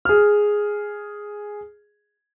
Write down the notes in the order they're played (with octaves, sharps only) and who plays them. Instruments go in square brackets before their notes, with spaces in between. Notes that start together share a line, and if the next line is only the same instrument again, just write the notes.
[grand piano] G#4 F6